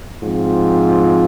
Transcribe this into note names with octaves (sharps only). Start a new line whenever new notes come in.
G#2 F3 C4 F4